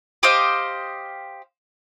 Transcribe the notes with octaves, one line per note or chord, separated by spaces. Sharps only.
G4 C5 D#5 F5